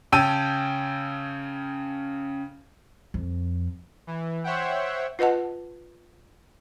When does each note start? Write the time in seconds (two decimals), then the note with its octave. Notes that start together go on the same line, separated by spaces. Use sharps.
0.12 C#3 C#4 G5 A5 E6 D#7
3.14 F2
4.07 E3
4.44 C5 C#5 E5 F#5 G5
5.19 F4 B4 D#5 F#5 A5